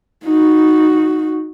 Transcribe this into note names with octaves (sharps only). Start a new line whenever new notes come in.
D#4 F#4